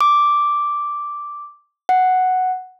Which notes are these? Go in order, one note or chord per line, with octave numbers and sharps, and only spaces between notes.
D6
F#5